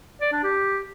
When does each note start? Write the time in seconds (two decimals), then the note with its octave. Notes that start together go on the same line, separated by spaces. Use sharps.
0.21 D5
0.32 D4
0.43 G4